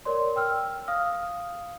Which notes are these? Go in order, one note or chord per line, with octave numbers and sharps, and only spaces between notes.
A#4 C#5 D5 C6
G5 E6 F6
F5 D#6 F6